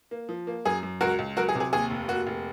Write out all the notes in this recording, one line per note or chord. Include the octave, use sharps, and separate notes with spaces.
A#3
F3
A#3
F#2 G#4
F#2
C#2 F#4 A#4
C#2
F#3 F#4 A#4
G#4
C3
G#4
D#2 G#4
F1
A#3 F#4
F1